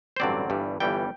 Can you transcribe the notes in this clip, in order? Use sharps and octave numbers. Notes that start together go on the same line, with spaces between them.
C5
A1 G2 D3 F#3 C4 D5
G1 G2 E3 G3
G1 G2 E3 G3 G5